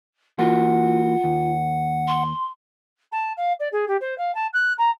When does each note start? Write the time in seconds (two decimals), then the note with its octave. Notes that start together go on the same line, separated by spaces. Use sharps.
0.39 E3 A#3 F4 F#4 F#5
1.24 D#2
2.07 C6
3.12 A5
3.37 F5
3.60 D5
3.72 G#4
3.88 G4
4.01 C5
4.18 F5
4.34 A5
4.53 F#6
4.78 A#5